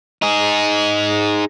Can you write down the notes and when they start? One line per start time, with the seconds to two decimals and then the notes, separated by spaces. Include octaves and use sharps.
0.22 D#4 G#4